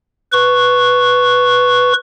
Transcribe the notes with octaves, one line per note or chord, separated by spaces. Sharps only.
B4 C#6